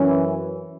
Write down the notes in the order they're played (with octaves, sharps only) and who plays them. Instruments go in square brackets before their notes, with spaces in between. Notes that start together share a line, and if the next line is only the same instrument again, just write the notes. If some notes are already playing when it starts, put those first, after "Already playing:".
Already playing: [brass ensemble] F#2 E3 C#4